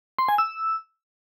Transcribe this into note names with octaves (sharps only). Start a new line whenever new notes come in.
C6
G#5
E6